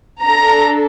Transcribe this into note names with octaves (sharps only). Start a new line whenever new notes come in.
D4 A4 A#5